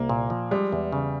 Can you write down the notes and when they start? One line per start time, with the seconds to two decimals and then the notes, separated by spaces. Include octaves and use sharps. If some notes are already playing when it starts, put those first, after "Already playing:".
Already playing: C2 A#3
0.09 A#2
0.30 F3
0.51 G3 G#3
0.72 E2
0.92 C#3